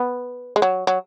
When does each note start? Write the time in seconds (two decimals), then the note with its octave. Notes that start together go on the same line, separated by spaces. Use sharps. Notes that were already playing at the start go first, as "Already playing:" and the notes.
Already playing: B3
0.56 G#3
0.62 F#3
0.87 F#3